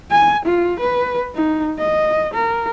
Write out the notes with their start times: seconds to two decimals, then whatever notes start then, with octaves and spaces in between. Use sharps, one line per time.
0.10 G#5
0.45 F4
0.80 B4
1.35 D#4
1.79 D#5
2.34 A#4